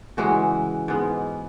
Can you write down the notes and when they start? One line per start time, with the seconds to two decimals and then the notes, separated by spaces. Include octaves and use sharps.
0.17 C#3 E3 G#3 F#4
0.88 G#2 G#3 B3